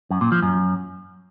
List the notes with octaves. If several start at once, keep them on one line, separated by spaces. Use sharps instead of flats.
F#2
A#2
F3
F#2